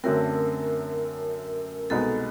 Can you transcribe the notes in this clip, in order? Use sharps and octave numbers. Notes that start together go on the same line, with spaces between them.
F#2 D3 F#3 A3 C4 A#4
C2 B2 G#3 B3 D#4 A4